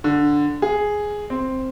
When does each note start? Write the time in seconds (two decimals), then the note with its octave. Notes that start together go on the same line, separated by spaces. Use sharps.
0.04 D3
0.62 G#4
1.30 C4